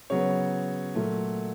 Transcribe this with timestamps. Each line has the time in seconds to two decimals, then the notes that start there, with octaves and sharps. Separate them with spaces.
0.10 C#3 F#3 B3 C#5
0.95 A#2 F#3 A3